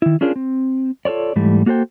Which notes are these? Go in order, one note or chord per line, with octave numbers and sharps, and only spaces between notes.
D#3 E4
C#4 D4 F4 G#4 A#4
C4
F4 A4 A#4 C#5 D5
G#2 E3 G3 A3
A#3 F#4 A4 C5 G5